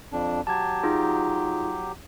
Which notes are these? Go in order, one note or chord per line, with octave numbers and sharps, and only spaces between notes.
F2 D4
F#3 G4 A5 G#6
D#4 F4 G#4